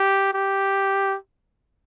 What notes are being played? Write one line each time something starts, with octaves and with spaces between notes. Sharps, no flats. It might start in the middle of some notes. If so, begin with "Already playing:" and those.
Already playing: G4
G4